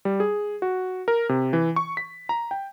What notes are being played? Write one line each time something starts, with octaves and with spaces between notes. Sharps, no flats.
G3
G#4
F#4
A#4
C3
E3
C#6
B6
A#5
G5